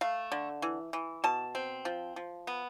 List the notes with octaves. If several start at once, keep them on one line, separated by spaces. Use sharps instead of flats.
A3 F5
D3
E3
E3
B2 A5
C4
F3
F3
B3